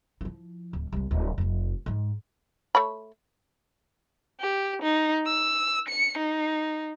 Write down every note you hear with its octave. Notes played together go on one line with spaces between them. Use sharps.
F3 E4
D1
C2 G#3
D1
F1 F2
G#2 G#3
A3 C#5 B5
G4
D#4
E6
C#7
D#4